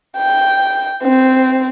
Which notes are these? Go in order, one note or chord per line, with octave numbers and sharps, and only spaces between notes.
G5
C4